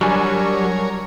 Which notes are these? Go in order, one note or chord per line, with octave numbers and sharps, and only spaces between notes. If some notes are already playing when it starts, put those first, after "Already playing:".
F#3 G3 D4 A#4 C#5 G#5 C#6